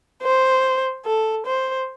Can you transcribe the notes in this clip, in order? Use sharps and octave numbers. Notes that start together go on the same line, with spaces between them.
C5
A4
C5